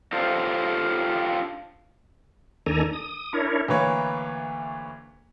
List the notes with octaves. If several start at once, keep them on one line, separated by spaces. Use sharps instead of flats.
D4 F4 G4 A4 C5
D#2 D#3 D4 A4 G#5 A#5
D#6
D4 E4 A#4 C#5
D2 E3 A#3 B4 C#5